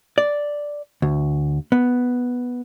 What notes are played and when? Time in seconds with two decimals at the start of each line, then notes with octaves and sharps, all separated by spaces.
0.18 D5
1.02 D2
1.72 B3